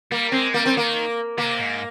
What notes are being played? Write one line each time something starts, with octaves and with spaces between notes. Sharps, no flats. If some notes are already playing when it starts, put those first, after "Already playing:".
G3 A#3
G#3 C4
G3 A#3
C4
D#3 A#3
C3 A#3
G#2